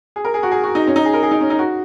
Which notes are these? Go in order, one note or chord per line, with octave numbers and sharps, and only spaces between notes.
G#4
A#4
G#4
F#4
G#4
F#4
D#4
C#4
D#4
G#4
A#4
G#4
D#4
C#4
D#4
F#4